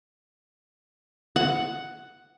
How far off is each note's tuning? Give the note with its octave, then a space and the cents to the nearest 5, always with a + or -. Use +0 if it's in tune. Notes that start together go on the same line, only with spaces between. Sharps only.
F#5 +5